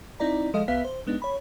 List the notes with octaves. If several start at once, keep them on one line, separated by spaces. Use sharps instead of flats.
C4 D#4 E4 D5 A#5
F3 G#3 A4 D#5 F5
C2 B3 B4 E5 F5 B6
C5
G#3 B3 D4 D#4
C#5 B5